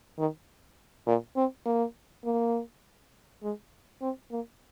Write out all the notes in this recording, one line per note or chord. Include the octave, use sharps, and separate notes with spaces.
D#3
A#2
C4
A#3
A#3
G#3
C4
A#3